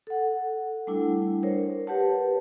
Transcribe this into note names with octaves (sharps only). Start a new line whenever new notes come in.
A4 F#5
G3 A3 D4 E4
A#4 C5 C#5
G4 B4 C#5 F#5 A5